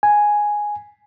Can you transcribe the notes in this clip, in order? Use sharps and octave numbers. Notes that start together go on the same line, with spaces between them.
G#5